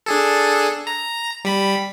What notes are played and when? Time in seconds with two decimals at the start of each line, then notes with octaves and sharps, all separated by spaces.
0.06 D4 G#4 A4
0.87 A#5
1.45 G3 B5